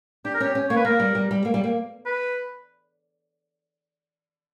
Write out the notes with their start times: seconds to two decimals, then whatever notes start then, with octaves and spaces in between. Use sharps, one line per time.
0.25 D4 G4
0.34 A#4
0.40 C#4 G4
0.55 C#4
0.69 A#3 C#5
0.76 B4
0.85 A#3 A#4
1.00 G3
1.15 G3
1.31 G3
1.45 A#3
1.54 G3
1.64 A#3
2.06 B4